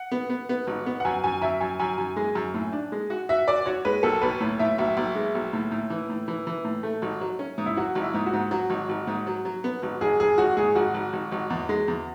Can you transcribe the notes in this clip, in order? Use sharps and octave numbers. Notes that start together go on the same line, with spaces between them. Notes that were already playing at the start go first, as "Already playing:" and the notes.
Already playing: F#5
B3
B3
B3
G#1
B3
F#5
F#2 G#5
F#2 G#5
F#2 E5
F#2 G#5
F#2 G#5
F#2
G#3
F#2
A2
D4
G#3
F#4
F#4 E5
F#4 D5
F#4 C#5
G#3 B4
B1 A4
B1 B4
A2 C#5
A2 E5
B1 E5
B1
G#3
B1
A2
A2
E3
A2
E3
E3
A2
A3
G#1
F#3
C#4
G#2
E4
F#3 F#4
G#1
E4
G#2
F#4
G#2
F#3 F#4
G#1
G#1
G#2
F#3
F#3
B3
G#1
G#1 G#4
G#1 G#4
G#1 F#4
G#2 G#4
G#1 F#4
G#1
G#1
G#1
E2
G#3
E2